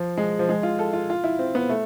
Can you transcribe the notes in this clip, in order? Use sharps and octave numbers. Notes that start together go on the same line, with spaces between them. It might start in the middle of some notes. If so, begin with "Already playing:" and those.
Already playing: F3
G#3
F3
G#3
F4
A4
F4
F4
E4
C4
B3
A3